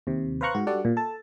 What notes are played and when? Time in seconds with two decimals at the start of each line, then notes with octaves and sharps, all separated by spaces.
0.07 D#2 C3
0.41 B4 C5 F5 A#5 C#6 F#6
0.55 G#2 F#4
0.67 G3 D4 F#4 A4 D5 F#5
0.85 A#2
0.97 A4 A5